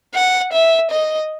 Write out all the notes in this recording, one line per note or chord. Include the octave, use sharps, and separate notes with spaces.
F#5
E5
D#5